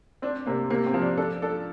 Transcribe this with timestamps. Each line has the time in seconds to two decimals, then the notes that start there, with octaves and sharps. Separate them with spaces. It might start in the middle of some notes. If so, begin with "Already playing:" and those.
0.22 C4 D4
0.46 C3 A#3
0.70 C3 A#3
0.86 C4
0.94 F3
1.02 D4
1.17 D4 A4
1.42 D4 A4